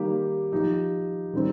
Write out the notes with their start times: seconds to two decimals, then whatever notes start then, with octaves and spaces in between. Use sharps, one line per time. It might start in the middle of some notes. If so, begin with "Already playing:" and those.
Already playing: D#3 G3 A#3 G4
0.52 F3 D#4 G4
1.33 D#3 G3 C4